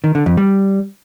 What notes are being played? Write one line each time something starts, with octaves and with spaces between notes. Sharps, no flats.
D#3
D3
F2
G3